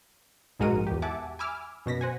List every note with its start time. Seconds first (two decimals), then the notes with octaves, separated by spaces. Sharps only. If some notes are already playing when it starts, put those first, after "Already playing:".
0.59 A#1 G#2 G#3 F#4 A#4 D#7
0.87 E2 G4
1.02 E5 F#5 G#5 A5 D6
1.39 G#5 B5 D6 E6 F6
1.86 F#2 B2 A#6 B6
2.01 C5 F#5 G#5